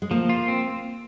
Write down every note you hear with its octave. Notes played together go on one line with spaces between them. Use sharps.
G#3
F3 A#3
F4
C4